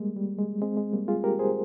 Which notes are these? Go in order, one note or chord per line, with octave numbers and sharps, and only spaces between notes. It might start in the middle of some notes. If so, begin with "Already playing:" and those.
Already playing: G3 G#3 A#3
G3
G#3
G#3 C4
G#3
G3 A#3
F4 G#4
G4 A#4
G#4 C5